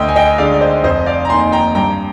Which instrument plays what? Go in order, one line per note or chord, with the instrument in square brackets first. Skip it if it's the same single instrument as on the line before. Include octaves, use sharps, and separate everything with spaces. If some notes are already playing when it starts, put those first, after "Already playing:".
Already playing: [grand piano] D2 D#5 G5
G#5
D#5 G5
D3 G#3 D5 F5
D5
C5 D#5
F1 C5 D#5
D5 F5
A#5
D#2 D#3 G#5 C6
G5 A#5
G2 G5 A#5